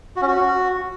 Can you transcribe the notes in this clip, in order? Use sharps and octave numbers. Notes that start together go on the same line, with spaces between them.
F#4
C#4
F#4